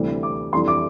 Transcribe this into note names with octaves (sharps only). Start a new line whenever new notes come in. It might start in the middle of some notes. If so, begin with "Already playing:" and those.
Already playing: D2 C3 E3 G3
D6
F2 E3 G3 D4 C6
D6